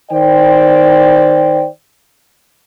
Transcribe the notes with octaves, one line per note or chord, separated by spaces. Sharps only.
D#3 C5 D5 G5